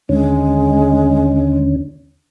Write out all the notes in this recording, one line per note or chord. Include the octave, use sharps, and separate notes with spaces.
D#2 D3 G#3 C#4